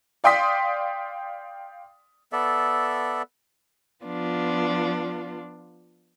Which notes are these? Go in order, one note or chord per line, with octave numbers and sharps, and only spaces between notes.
D5 F5 G5 C6 D#6 B6
B3 A4 D5 E5
F3 B3 D4 F4